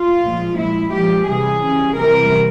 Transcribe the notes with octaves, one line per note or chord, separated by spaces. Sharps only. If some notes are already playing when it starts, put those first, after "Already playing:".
Already playing: F4
A#2 F3 G#3
A#2 G#3 E4
A#2 F3 G#3 G4
C3 E3 G3 G#4
C#3 G3
C3 E3 G3 A#4